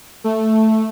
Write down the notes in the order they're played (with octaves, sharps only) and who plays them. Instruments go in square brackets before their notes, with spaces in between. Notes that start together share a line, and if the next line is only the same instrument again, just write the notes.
[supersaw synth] A3